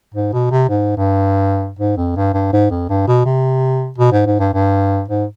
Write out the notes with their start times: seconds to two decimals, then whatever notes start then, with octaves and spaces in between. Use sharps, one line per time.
0.14 G#2
0.33 B2
0.51 C3
0.69 G#2
0.97 G2
1.79 G#2
1.97 F2
2.16 G2
2.34 G2
2.53 G#2
2.71 F2
2.89 G2
3.07 B2
3.25 C3
3.98 B2
4.12 G#2
4.26 G#2
4.40 G2
4.54 G2
5.08 G#2